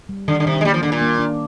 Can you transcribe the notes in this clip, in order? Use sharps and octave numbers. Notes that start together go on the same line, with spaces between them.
G3
D3 D#3
D3
C3 D#3
G#3
G3 A#3
F3
D3 D4
A#2
A#3
D4